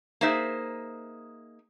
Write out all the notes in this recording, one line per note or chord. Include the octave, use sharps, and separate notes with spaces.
A#3 D#4 G#4 C5 E5